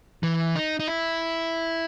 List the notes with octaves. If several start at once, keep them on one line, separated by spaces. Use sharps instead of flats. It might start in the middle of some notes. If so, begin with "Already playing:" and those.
E3
D#4
D#4
E4